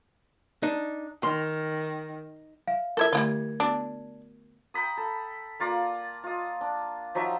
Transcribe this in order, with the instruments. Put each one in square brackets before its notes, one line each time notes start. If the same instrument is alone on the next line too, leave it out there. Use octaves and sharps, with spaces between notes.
[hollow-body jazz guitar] D4 D#4
[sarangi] D#3 [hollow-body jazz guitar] C6
[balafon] E5 [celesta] F5
[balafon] E4 F4 [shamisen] A4 C5 E5 [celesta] A#4 G#6
[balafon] D3 A3 E5 [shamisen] G3 E4 F4
[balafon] B3 F#4 [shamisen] D4
[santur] G5 A#5 B5 D#6
A4
A#3 F4 D5 A#5
F4 D#5
D4
F3 F#3 D#4 E5